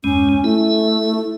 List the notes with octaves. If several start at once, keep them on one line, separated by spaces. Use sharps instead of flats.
E2 G2 G#3 C#4
A3 E4